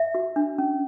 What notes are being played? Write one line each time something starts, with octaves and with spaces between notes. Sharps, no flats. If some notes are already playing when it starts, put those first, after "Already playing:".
Already playing: E5
F#4
D4
C#4